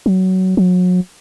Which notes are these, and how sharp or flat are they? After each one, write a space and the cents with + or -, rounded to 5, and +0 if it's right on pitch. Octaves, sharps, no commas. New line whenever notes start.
F#3 +15
F#3 -35